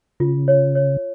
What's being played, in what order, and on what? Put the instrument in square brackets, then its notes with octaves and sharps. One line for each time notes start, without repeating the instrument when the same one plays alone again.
[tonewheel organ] C#3 [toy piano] F4
[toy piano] C#5
C#5